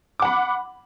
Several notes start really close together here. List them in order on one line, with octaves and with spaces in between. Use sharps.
D6 F#5 B5